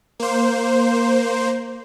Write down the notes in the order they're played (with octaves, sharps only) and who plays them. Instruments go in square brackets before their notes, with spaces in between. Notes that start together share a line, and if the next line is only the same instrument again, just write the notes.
[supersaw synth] A#3 C5